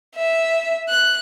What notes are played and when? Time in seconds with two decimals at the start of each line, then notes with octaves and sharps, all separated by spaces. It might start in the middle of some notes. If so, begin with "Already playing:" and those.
0.16 E5
0.88 F#6